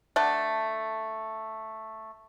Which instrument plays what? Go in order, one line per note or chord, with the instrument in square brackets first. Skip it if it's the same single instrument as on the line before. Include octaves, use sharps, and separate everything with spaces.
[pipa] A3 D4 A4 F#5